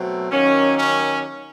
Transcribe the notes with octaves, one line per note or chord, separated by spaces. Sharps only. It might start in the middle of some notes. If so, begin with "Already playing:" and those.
Already playing: B2 F#3 A3 C4
D#3 F#3 A#3 C#4
C#4